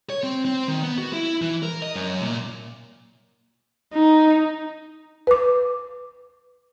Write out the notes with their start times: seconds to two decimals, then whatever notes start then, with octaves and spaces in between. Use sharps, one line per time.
0.10 C#5
0.23 C4
0.45 C4
0.68 D#3
0.83 B3
0.98 F#4
1.13 E4
1.42 E3
1.63 A#4
1.82 D#5
1.95 F#2
2.23 A#2
3.94 D#4
5.27 B4 D6